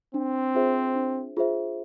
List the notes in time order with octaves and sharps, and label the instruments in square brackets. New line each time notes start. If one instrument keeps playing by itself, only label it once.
[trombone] C4 [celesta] D4
[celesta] F4 G#4 C5 E5
D4
F4 G#4 C5 E5